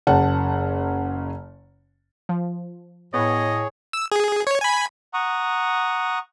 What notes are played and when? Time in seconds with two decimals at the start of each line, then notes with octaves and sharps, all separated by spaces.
0.07 F#1 C#3 F#5 A5
2.29 F3
3.14 A2 B3 G#4 C#5 D#5
3.93 E6
4.12 G#4
4.47 C#5
4.61 G#5 B5
5.14 F#5 A#5 C#6 D#6